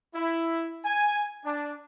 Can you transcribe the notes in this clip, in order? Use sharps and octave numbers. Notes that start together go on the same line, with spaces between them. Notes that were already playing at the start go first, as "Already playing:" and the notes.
E4
G#5
D4